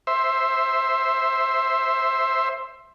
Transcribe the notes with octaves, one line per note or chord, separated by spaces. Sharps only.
C5 E5